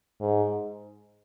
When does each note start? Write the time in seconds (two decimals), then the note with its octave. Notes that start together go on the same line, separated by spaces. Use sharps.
0.20 G#2